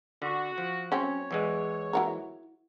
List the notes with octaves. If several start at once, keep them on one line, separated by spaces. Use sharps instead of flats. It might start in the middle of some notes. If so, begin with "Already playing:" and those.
D3 F#4
F3
F#3 C4 C#4 C#5
E2 E3 G#3
E4 F#4 A#4